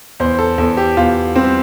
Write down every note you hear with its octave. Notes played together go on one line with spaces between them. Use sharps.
E2 C5
A4
E2 A4
G4
E2 F4
G3 C4